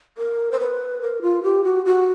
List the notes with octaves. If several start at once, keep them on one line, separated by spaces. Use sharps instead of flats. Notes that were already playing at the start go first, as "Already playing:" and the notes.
A#4
C5
B4
A#4
F4
G4
F#4
F#4